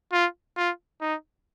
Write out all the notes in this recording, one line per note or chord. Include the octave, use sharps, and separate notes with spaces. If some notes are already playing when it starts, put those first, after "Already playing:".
F4
F4
D#4